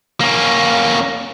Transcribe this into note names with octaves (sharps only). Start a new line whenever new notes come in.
A#3 C#4